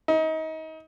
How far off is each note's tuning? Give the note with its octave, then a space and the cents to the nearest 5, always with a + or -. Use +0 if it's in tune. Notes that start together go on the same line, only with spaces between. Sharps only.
D#4 +30